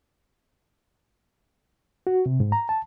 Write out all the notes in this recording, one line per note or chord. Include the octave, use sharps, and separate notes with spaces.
F#4
C3
G#2
A#5
A5